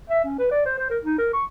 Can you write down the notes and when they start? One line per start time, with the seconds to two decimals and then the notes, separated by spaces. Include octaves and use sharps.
0.10 E5
0.25 C#4
0.39 B4
0.51 D5
0.66 C5
0.78 C5
0.90 A#4
1.04 D#4
1.18 A#4
1.33 C#6